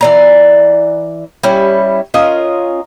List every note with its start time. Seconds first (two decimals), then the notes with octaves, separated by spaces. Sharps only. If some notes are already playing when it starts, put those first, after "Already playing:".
0.01 E3 D5 A#5
1.43 G3 C#4 E4
2.14 C#4 F4 A#4 D#5